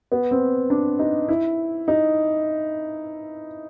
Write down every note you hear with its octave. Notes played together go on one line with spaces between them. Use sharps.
B3
C4
D4
D#4
E4
D#4